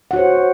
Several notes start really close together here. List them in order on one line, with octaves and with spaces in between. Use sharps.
F#5 F#4 C#5 C5